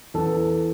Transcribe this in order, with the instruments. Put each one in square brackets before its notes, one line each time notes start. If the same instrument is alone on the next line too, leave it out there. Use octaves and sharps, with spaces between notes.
[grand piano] E2 E3 A4